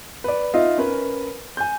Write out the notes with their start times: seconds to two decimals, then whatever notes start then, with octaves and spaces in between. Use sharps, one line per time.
0.24 B4 D5
0.54 D#4 F4 D#5 E5
0.78 C#4 A#4 B4
1.57 G#5 G6